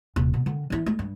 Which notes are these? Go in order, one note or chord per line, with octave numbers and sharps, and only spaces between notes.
D#1 C3
B2
D3 D#3
E3 E4
A3
G2